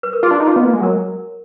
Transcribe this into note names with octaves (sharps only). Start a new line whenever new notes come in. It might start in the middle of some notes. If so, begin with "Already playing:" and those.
B4
A#4
F4 G#4
D4
D#4
F4
B3
A#3
G#3
F#3 A#4